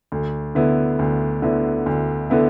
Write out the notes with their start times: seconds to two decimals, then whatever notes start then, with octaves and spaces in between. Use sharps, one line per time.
0.12 D2
0.55 D3 B3 E4
0.99 D2
1.42 D3 B3 E4
1.86 D2
2.30 D3 B3 E4